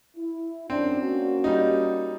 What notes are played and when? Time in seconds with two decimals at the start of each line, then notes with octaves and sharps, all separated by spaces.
0.17 E4
0.70 F#2 C4 D4
1.01 A#3 C#4 F#4
1.44 G3 D#4